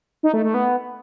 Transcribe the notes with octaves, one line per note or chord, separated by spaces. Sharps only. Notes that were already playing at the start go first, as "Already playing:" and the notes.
D#4
A3
A3
B3